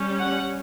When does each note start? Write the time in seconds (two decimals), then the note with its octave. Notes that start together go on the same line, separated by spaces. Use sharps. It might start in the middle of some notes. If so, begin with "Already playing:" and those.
Already playing: G3 C#4
0.19 F#5